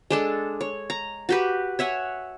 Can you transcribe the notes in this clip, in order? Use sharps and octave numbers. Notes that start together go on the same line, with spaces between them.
G#3 D4 A4
C#5
A#5
F#4 G4 B4
C#5 E5 F#5 G#5